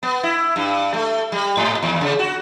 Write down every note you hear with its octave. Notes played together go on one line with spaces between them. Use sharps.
B3
E4
G2
A3
G3
G#2
D#2
C#3
F#4